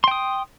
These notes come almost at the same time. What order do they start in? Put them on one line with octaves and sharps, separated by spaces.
C6 G5 D#6